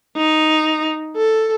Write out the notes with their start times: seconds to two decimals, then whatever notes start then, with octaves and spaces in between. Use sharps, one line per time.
0.17 D#4
1.17 A4